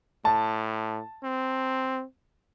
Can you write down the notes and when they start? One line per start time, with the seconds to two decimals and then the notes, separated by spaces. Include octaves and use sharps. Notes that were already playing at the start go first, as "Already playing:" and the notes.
0.25 A2 A5
1.23 C4